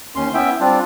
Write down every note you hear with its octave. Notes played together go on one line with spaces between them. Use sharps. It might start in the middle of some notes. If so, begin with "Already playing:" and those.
D#2 C#4 C6
B3 C#4 E4 E5 G5
G3 C4 D4 F4